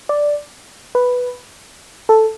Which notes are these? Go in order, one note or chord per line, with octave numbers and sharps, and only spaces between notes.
D5
B4
A4